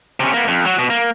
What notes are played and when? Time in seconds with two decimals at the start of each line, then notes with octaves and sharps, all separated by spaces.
0.20 C3 C#4
0.33 A#3 B3
0.48 F2
0.65 F#3 F#4
0.78 B2
0.90 A#3